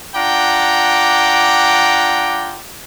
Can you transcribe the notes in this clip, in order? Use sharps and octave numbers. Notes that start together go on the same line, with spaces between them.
D4 F4 F#5 G5 A#5 D6